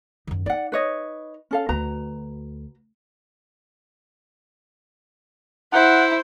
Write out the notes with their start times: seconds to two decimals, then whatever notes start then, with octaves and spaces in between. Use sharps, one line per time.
0.27 F#2 D#3
0.46 D#4 D5 F#5
0.72 B4 C#5 D#5
1.51 C#4 A4 F5
1.69 D2 F#4 B4 A#5
5.73 E4 C5 F#5